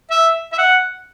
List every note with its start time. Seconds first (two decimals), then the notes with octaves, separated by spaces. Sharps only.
0.11 E5
0.52 E5
0.58 F#5